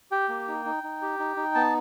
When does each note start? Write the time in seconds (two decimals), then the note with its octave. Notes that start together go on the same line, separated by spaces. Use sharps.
0.11 G4 G5
0.29 A#3
0.48 D#4
0.65 D#4
0.83 D#4
1.02 G4
1.19 D#4
1.37 D#4
1.55 B3 A5